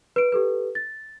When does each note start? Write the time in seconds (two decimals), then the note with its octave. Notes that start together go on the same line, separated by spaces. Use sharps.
0.16 B4 D7
0.32 G4 A4 B4
0.75 A6